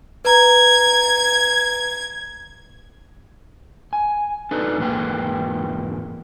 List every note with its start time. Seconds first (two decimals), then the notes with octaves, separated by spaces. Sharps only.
0.25 B4 A#5 G#6
3.93 G#5
4.51 D4 D#4 A4 B4
4.78 E2 G#2 A#3 B4 G5